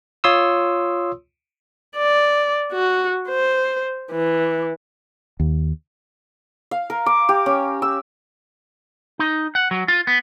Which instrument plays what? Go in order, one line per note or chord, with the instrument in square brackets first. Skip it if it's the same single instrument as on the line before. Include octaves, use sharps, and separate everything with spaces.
[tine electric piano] F4 C#5 C6 D#6 E6
[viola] D5
F#4
C5
E3
[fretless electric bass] D#2
[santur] F5
A#4
D6
G4
C#4
E6
[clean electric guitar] D#4
F#5
F#3
F4
B3